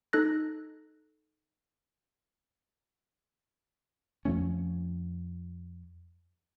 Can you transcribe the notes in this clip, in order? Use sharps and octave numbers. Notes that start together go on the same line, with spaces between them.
D#4 A4 F#6 A#6
F2 F3 A3 C#4